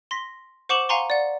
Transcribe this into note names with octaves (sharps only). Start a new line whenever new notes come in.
C6 A#6 B6
C5 F#5 C#6 D6 E7 F#7
F5 F#5 G#5 A#5 C6 C#6
D5 F#5